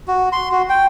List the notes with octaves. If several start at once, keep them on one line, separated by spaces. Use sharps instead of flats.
F#4
C6
F#4
G5